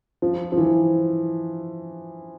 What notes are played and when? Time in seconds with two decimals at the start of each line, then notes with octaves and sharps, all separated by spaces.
0.22 F3
0.52 F3
0.57 E3